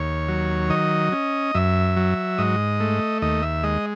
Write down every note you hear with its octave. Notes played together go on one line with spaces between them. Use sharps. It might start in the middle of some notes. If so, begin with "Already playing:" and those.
Already playing: D#2 C#5
F#3
D#3 D#5
C#4
F#2 E5
F#3
G#2 D#5
A3
D#2 D#5
E5
G#3 D#5